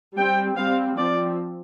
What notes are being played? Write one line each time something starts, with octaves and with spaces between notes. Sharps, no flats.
G3 C4 G5
G3 C4 F5
F3 C4 D5